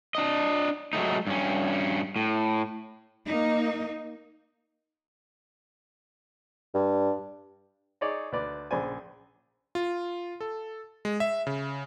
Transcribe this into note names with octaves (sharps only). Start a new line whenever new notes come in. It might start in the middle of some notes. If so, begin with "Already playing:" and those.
D4 D#5
F#3 G#3 A3 D#4
G2 C#4
A2
A#3 D#4
G2
D#4 G#4 C#5 D5
D2 B4 D5
A#1 C#3 C5 D5 G#5
F4
A4
G#3
E5
C#3